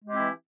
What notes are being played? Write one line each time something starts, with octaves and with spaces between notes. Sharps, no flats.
E3 G#3 C4 E4 G4